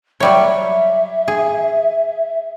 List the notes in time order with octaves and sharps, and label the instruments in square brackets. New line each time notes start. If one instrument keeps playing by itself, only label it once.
[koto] F#3 G3 C#5 [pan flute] E5
[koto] G#4